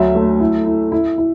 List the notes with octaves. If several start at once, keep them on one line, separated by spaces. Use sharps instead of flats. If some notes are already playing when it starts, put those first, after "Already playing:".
Already playing: D2 F#3 E5
A3
E4
E4
E4
E4